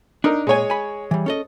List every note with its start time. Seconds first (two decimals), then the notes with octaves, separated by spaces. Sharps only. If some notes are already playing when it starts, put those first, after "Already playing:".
0.24 D4 D#4 A#4
0.47 A#2 G#3 C#5 G#5
0.70 G#5 B5
1.11 E3 G3
1.26 C#4 A4 D#5